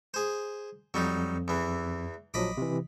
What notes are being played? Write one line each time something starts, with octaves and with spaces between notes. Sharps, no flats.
G#4 C5
F2 F#3 G3 D#4
E2 E3
A#1 F3 F#3 D#5 B5 D6
C3 E3